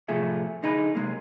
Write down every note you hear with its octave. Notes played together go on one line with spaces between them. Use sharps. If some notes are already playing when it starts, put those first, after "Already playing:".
A2 C3 F3 A3 G#4 E5
D3 D#4 G#4 B4
C3 G#3 A#3